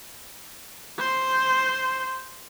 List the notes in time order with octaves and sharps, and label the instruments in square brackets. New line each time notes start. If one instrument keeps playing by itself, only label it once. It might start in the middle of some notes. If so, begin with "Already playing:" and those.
[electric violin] C5 C6